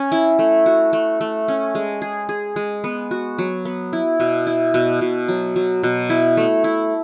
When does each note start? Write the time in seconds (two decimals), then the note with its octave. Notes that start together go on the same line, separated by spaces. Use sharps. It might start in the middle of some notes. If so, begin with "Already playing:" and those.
Already playing: C#4
0.12 E4
0.39 A3
0.66 F#4
0.93 A3
1.21 A3
1.48 C#4
1.75 G#3
2.02 G#4
2.29 G#4
2.56 G#3
2.84 B3
3.11 F#4
3.39 F#3
3.65 B3
3.93 E4
4.20 B2
4.47 E4
4.74 B2
5.01 B2
5.28 F#3
5.56 F#3
5.83 B2
6.10 E4
6.37 A3
6.64 E4